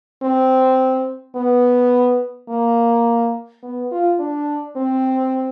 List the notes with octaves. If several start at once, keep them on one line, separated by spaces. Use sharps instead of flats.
C4
B3
A#3
B3
F4
D4
C4